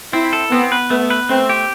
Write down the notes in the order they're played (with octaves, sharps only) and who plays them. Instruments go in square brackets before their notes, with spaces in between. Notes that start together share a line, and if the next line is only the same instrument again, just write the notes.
[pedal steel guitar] C4 [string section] E4
[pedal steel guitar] A4
[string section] B3 [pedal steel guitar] C4
[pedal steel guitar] B4
[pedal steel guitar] A3 [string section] B3
[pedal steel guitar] B4
[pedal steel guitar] A3 [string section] C4
[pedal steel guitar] G4